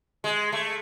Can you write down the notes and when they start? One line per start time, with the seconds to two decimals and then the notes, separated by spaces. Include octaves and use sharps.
0.24 G#3
0.52 A3